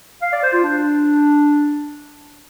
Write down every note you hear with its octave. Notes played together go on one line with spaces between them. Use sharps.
F5
D5
C5
F4
D4